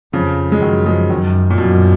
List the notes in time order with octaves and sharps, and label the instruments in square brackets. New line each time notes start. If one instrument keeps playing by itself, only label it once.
[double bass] F2 [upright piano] C#3 F3
[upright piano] G#3
[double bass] F#2 [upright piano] D#3 F#3
[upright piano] F3 G#3
[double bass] F#2 [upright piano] D#3 F#3
[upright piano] A#2
[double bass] F#2 [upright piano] B2